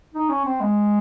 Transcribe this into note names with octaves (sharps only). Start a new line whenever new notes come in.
D#4
C#4
C4
G#3